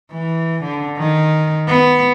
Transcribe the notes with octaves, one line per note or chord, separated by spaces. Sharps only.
E3
D3
D#3
B3